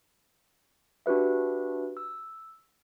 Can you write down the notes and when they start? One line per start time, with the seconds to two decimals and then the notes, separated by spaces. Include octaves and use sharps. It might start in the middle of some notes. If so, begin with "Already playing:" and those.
1.06 D4 F#4 G4 B4 E5
1.97 E6